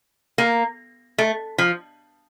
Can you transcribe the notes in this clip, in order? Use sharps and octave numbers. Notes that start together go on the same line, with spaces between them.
A#3
A3
F3